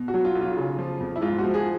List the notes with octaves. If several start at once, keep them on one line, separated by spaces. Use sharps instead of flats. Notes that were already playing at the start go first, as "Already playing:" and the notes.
Already playing: B2
F#4
F#3
F4
B1
F4
C#3
F3
F2
E4
G#2 F4
F#4
F3
G#4